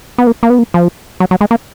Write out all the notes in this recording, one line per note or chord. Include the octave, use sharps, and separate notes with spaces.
B3
A#3
A#3
B3
A#3
F3
F#3
F#3
G#3
A#3